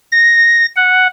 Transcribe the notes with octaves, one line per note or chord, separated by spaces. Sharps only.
A#6
F#5